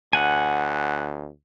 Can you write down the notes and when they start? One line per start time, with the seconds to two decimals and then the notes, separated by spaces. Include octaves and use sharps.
0.13 D2 F#5 G#5